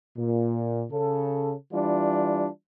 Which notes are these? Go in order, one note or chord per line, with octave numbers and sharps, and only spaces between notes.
A#2
C#3 A4
E3 G3 D4 F4